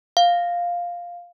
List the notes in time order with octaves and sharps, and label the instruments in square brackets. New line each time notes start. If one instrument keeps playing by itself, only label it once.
[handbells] F5